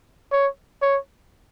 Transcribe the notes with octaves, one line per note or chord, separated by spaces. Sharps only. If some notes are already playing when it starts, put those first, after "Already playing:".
C#5
C#5